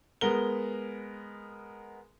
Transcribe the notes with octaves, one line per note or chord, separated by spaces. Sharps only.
G#3 B3 A#4 G7